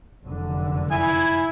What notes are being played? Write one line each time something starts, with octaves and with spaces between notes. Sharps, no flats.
F1 F#2 D3
E4 G#5